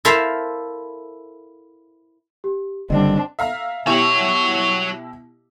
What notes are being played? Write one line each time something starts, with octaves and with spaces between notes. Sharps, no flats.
E4 A4 A#4 C5 E5 F5
G4
F#1 D3 G3 C4 D4 D#5
E5 F5 A#5
B2 E4 F#4 G4 C#5